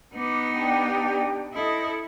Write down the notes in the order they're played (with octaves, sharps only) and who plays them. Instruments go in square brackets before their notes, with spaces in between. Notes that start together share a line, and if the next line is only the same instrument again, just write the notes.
[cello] B3 D#4 [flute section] B4 D6
[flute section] D4 G4 G5
[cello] E4 A4 [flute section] C5 D#5 D#6